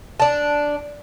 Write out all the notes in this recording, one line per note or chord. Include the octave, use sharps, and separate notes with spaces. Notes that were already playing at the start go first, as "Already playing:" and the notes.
D4 A5